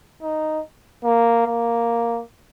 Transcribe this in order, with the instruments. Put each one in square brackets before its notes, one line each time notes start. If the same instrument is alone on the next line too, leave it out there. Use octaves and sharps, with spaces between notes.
[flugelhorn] D#4
A#3
A#3